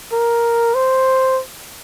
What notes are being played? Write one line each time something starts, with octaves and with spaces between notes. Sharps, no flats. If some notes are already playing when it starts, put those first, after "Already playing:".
A#4
C5